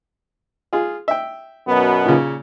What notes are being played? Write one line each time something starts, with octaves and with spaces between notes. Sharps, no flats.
F4 G#4
E5 G5
F#2 B2 B3
A#2 C#3